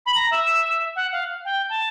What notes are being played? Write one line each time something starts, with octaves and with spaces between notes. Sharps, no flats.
B5
A#5
E5
F#5
F5
G5
A5